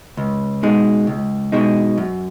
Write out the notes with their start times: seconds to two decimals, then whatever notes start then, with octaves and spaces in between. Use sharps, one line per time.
0.17 C#2
0.63 B2 G#3 D#4
1.07 C#2
1.52 B2 G#3 D#4
1.98 F#2